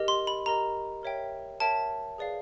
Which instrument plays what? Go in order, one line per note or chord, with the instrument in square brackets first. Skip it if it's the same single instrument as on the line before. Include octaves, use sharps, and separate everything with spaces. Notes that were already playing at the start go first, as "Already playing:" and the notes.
Already playing: [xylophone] G4 A#4 D#5
C6
B5
G4 A#4 D#5 A#5
A#4 C#5 E5 G5
A#4 C#5 E5 G5 A5
G#4 B4 D5 F5